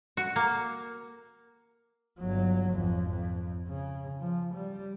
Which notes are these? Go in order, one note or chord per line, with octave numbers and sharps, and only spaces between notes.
F#4
A#3
G1 F#3
G#1 F2
F2
C#3
F3
G3